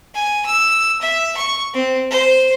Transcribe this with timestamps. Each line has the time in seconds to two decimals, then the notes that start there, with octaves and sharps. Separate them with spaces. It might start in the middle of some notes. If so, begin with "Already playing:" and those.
0.14 G#5
0.45 E6
1.02 E5
1.37 C#6
1.74 C4
2.11 C5